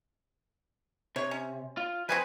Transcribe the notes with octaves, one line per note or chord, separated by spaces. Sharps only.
C3 C#5
C#4
F4
F3 C4 G#4 B4 G#5